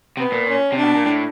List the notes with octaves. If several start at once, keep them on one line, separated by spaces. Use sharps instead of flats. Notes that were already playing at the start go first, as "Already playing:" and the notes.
C3 B3
A#2
C#4
C3 D4
B2
A#2
A2